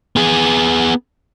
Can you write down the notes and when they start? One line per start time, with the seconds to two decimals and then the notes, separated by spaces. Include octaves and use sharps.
0.16 B3 G#4